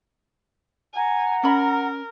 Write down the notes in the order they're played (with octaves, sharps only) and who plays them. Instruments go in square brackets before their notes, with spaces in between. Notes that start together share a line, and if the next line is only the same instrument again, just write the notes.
[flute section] F#5 A#5 [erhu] G#5
[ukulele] C#4 B5 [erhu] A#4